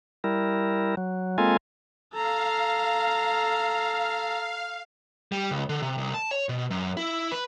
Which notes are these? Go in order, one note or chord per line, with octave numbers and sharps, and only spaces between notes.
G3 E4 A#4
F#3
G#3 A#3 C4 F4 A4 G#5
A4 F5 A#5
G3
C#2
D3
C3
C2
A5
C#5
B2
F#2
E4
B4